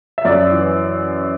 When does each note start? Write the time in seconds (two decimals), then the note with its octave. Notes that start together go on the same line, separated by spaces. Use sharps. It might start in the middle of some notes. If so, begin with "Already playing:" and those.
0.18 E5
0.25 F#2 D5
0.51 E3